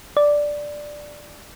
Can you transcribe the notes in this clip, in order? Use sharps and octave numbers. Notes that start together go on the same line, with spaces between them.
D5